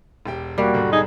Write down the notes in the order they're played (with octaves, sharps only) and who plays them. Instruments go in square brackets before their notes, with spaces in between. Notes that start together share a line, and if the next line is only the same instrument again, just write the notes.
[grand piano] E1 G4 G5
[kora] G3 [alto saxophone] A#3 [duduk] F#4
[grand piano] B1 G#2 D3
[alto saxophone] D#4 [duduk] G#4